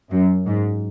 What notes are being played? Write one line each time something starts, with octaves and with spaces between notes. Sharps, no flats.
F#2
G#2